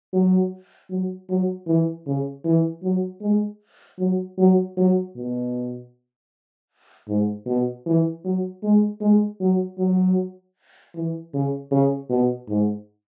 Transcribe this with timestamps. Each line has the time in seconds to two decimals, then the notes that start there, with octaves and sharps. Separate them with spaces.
0.13 F#3
0.90 F#3
1.29 F#3
1.67 E3
2.07 C#3
2.45 E3
2.84 F#3
3.21 G#3
3.99 F#3
4.38 F#3
4.77 F#3
5.16 B2
7.09 G#2
7.46 B2
7.86 E3
8.24 F#3
8.63 G#3
9.01 G#3
9.41 F#3
9.78 F#3
10.95 E3
11.34 C#3
11.71 C#3
12.10 B2
12.49 G#2